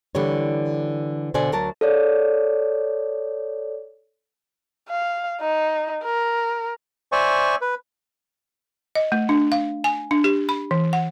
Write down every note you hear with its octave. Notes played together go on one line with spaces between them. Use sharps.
D3 E3 G3 C#5
B2 D3 C5 D5 G#5
D2 F#3 A#4 A5
A4 C#5 D5
F5
D#4
A#4
C5 D5 E5 G#5 C#6
B4
D#5
A3
D4
F5
G#5
D4
G4
B5
E3
F#5